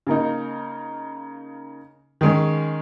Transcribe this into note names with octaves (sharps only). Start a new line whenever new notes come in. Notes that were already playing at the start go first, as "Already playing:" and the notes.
C#3 A#3 D#4
D#3 G#3 C#4